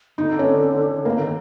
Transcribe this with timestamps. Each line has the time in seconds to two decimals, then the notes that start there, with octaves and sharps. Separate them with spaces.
0.18 D3 D#4
0.39 C#4
1.05 D3 A#3
1.20 D#3